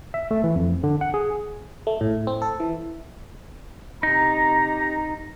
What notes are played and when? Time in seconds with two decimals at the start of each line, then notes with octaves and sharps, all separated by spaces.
0.14 E5
0.31 A3
0.44 E3
0.56 F2
0.83 D3
1.01 F#5
1.14 G#4
1.87 A3
2.01 A2
2.27 C4
2.42 A4
2.60 E3
4.03 C3 D#4 G4 A#5